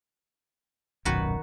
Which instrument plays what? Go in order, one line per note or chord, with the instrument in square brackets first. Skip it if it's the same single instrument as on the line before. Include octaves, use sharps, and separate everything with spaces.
[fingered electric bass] D#1 B1 F#2 [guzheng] D#3 F#4 B4